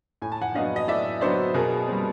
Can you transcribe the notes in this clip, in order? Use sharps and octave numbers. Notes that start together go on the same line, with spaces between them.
A2 G#5
A5
F#5 G#5
F#3 B3 D4 D#5 F5
D#5
A2 D5 E5
F#3 B3 D4 C5 D5
B2 G#4 A#4
G3 C4